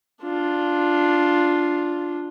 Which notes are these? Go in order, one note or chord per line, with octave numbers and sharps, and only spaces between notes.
D4 F4